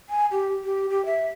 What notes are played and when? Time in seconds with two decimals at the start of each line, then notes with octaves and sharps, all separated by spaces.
0.10 G#5
0.31 G4
0.64 G4
0.90 G4
1.05 E5